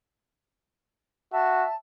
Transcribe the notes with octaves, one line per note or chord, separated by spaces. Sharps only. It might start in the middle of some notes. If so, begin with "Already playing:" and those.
F#4 E5 A5